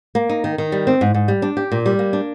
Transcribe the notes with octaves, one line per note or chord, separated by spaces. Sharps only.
A#3
D#4
D#3
D#3
G3
C4
G#2
G#2
G3
D4
G4
A#2
G3
A#3
D4